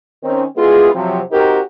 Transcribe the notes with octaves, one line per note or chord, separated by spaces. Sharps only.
D#3 C4 C#4
G#3 B3 E4 F4 G#4
C3 F3 F#3
C4 D#4 F#4 G4 A#4